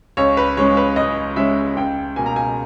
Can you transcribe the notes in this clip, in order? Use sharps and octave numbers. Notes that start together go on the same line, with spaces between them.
C#2 C#5
B4
C#3 G#3 C#4 C#5
B4
C#2 D#5
C#3 G#3 C#4 E5
C#2 G5
B2 A#3 G#5
A#5
G#5